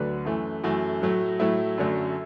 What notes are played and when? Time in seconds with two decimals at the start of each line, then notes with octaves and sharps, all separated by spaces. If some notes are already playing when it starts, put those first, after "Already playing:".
Already playing: D2 D3 F#3 B4
0.25 F#2 E3 A3
0.64 F#2 E3 A3 F#4
1.02 A2 F#3 A3
1.39 A2 F#3 A3 E4
1.78 F#2 D3 F#3 A3